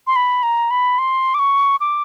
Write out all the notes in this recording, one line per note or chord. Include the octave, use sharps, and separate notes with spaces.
C6
B5
A#5
B5
C6
D6
C#6
D6